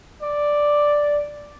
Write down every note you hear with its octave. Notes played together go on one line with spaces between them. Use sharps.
D5